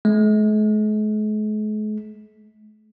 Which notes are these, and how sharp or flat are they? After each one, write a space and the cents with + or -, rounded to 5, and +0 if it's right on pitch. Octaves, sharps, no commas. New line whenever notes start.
G#3 +45